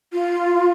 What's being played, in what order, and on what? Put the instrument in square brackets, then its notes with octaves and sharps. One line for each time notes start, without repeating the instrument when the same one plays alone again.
[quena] F4